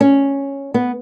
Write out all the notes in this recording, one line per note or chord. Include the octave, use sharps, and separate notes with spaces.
C#4
B3